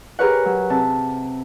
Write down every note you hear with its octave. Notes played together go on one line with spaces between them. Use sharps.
G4 G#4 A#4 B4 C#5 F#5
F#3
C3 A5